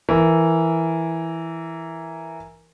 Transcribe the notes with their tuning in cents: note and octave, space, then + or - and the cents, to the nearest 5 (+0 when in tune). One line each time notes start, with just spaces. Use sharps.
E3 +0 A#4 +0